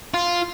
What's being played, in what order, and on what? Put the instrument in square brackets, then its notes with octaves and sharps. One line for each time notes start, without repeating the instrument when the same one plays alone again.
[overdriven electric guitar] F4